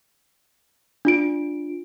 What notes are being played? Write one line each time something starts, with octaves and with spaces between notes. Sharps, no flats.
D4 F4 D7